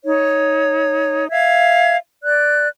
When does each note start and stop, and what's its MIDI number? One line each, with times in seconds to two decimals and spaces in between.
0.05 1.28 63
0.05 1.28 73
1.30 1.96 76
1.30 1.96 77
1.30 1.96 92
2.23 2.68 74
2.23 2.68 90